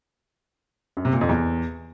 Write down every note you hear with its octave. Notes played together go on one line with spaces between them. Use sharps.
F#2
C3
A#2
F2
E2